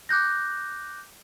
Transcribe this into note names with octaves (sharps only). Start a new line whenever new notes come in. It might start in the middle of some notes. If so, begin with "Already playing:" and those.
D6 F#6 G6 A#6